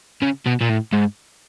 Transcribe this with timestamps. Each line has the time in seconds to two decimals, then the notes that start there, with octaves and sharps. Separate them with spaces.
0.22 C#3
0.46 B2
0.61 A#2
0.69 A2
0.93 G#2